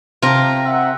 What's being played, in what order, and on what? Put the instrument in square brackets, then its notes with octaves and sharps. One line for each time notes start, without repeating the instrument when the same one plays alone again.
[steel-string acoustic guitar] C3 G4 [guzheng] F4 A#4
[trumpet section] E5 F#5